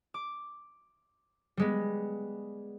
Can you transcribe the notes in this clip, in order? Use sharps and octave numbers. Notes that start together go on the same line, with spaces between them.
D6
G3 G#3 B3